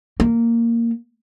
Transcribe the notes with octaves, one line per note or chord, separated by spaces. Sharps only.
A#3